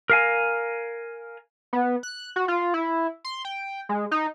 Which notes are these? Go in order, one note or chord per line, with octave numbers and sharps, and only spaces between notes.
A#4 F5 G#5
B3
F#6
F#4
F4
E4
C6
G5
G#3
D#4